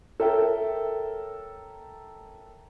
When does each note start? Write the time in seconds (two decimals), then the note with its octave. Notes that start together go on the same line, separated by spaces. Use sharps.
0.20 A4 A#4 C#5 E5 G5